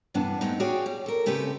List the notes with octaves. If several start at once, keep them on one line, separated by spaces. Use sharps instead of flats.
D2 G2 C3 E3 B3 D4
G#3 A3 C4 D#4
F#4 G#4 C#5 D5 F5 G5
G3
A4 A#4
C#3 A3 C4 G4 A4 B4